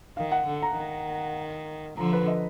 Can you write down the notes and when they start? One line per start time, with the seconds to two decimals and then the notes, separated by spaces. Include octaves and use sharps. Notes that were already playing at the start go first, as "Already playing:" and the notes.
0.17 D#3 F5
0.32 F#5
0.47 D3
0.63 A#5
0.77 D#3
1.97 D3 F3 A#5
2.13 B4
2.28 D#5